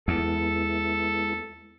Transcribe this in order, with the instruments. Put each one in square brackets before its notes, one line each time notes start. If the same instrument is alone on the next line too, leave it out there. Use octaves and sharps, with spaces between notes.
[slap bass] E2 [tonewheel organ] G#3 B3 E4 [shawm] A4